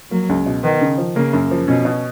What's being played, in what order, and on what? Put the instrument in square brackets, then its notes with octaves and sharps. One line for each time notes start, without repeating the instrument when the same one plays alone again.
[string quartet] F#3 [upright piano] A#3
[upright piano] C#2
B2
[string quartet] D#3 [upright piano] B3
[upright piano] C#3
F3
[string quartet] C#3 [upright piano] A#3
[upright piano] F#2
F3
[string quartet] B2 [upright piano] C#4
[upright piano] B2